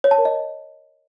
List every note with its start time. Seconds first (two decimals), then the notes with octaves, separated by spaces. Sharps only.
0.04 C#5
0.11 A5
0.18 A#4
0.25 D#5